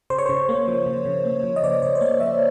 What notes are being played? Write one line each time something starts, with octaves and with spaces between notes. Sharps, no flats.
C#3 C5
C#5
C#3 C5
A#3
F3
C#3
C#3
A#3
F3
D#5
C#3 D5
C#3 C#5
C5
A#3 C#5
F3 E5